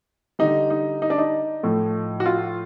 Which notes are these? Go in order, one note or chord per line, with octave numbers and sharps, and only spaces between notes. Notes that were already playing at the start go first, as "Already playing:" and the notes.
D3 G3 D#4
D#4
D#4
D4
D#4
A2 F3 A3
F#4
F4